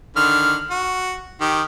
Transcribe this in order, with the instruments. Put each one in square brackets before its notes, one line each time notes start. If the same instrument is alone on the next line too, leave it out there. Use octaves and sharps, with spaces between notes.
[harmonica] D3 D#3 F6
F#4
D#3 G4